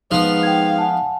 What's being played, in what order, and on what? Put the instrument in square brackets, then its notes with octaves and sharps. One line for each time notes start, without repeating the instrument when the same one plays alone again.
[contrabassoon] G#2 [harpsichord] F3 B3 [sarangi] F5
[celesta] G5 G#6
F#5 G#5 A5